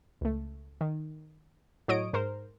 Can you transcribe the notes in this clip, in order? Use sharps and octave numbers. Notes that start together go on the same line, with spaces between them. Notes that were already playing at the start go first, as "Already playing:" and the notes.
C#2 A3
D#3
A2 F#3 C#5 D#5 D#6 D7
G#2 A#4 C5